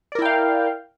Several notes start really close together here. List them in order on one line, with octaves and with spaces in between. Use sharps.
D5 A#4 E4 G5 F5